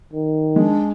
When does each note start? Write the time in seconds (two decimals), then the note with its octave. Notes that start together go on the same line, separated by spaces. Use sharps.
0.13 D#3
0.56 G#3 D4